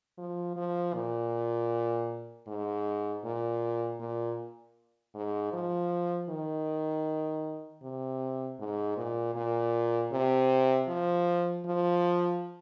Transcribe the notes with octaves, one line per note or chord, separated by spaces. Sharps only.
F3
F3
A#2
G#2
A#2
A#2
G#2
F3
D#3
C3
G#2
A#2
A#2
C3
F3
F3